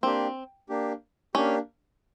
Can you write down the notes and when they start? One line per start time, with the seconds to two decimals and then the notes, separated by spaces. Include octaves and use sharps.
0.03 A#3 C4 D4 G4
0.69 A#3 D4 G4
1.35 A#3 C#4 D4 G4